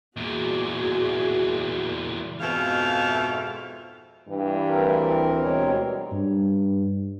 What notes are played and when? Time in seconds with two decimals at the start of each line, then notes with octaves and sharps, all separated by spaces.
0.17 E2 A#2 F#4 G#4
2.41 F2 G#2 B2 E5 F5
4.28 G2 E3
4.69 D2 C4 A#4
5.42 B2 G3 G#3 C#5
6.12 G2